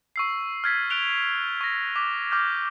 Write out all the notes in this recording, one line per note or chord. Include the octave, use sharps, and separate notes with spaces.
C#6 E6 C7
F6 F#6 G#6 A6 B6
F#6 D7 F7 G7
C#6 A#6
D6 F#6 B6
D6 F6 G6